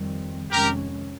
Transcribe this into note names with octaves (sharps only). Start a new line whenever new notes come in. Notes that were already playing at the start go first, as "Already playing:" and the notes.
Already playing: F2 D#3 G3 C4
F2 C3 D#3 G#3 C#4 G4 A#4